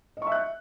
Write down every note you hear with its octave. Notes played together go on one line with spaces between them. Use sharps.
D#5 E5 C#6 F#6